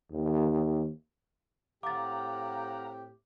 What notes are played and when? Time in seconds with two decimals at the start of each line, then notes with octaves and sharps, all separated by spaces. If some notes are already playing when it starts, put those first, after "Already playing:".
0.11 D#2
1.83 A2 C4 G4 F5 F#5 A#5 D6 A6